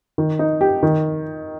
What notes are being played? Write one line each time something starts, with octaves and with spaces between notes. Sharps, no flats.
D#3
D#4
G4
D#3